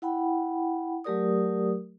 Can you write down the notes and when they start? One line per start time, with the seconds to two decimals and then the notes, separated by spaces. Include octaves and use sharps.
0.02 E4 F#5 G5 B5
1.04 F#3 A3 G4 A#4 D5 D#6